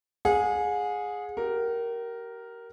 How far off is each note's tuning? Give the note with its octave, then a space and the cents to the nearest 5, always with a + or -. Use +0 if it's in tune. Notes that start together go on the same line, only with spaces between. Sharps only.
G#4 +0 F#5 -40
G4 -35 A#4 +0